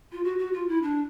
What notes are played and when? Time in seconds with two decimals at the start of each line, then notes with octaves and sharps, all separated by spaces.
0.12 F4
0.24 F#4
0.38 F#4
0.53 F4
0.68 E4
0.82 D4